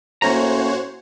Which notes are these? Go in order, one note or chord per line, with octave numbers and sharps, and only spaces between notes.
A2 A#3 C#4 F#4 C5 C#5 A#5